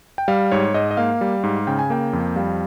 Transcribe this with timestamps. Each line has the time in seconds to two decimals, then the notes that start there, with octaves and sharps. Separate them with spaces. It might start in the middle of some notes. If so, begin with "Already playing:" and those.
0.18 G5
0.28 G3 F5
0.52 G#2 C#5
0.74 G#2 D#5
0.91 D#5
0.97 A#3 F5
1.21 G3
1.43 G#2
1.67 C#3 G5
1.79 G#5
1.90 A#3 G5
2.13 F2
2.36 G3 F5